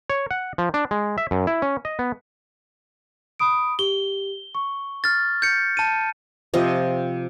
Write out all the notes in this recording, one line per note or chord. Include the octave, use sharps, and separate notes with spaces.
C#5
F#5
F3
D4
G#3
E5
F#2
E4
C#4
D#5
B3
B5 D#6 D7
G4 G7
C#6
F6 A6
G6 C#7
A5 D#7
C3 F3 D#5